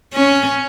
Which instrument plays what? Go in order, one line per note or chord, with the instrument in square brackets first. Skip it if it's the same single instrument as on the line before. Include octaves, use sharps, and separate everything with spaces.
[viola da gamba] C#4